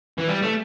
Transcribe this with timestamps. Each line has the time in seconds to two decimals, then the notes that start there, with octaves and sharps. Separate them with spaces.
0.18 E3
0.28 G3
0.43 A3